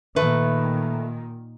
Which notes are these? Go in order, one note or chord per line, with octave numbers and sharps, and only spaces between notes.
A#2 D#3 A3 B4